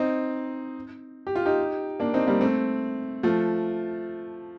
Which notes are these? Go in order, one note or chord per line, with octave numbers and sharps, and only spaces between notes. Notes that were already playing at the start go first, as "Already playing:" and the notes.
Already playing: C4 D#4
G4
F4
D#4 G4
A#3 D4
C4 D#4
G3 A#3
A3 C4
F3 A3